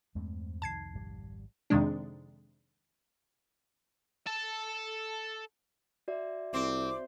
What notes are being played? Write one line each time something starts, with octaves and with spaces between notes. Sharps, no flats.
E2 G2 G#3 A3 C4 D4
C2 F2 D#3 A5 G#6 C7
G#1 G3
F2 C3 D#3 G#3 D4
A4 A5
F#4 D5 E5
C2 C4 D6